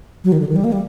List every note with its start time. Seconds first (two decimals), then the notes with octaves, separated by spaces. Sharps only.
0.24 F#3
0.32 D#3
0.40 D3
0.49 D#3
0.56 G3
0.64 A#3
0.72 G3